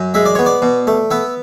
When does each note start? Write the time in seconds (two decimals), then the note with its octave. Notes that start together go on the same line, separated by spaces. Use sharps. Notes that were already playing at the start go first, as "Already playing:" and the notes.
Already playing: F#2
0.14 G#3 E5
0.26 D5
0.35 B3 C#5
0.46 D5
0.62 B2
0.87 A3
1.11 B3 E5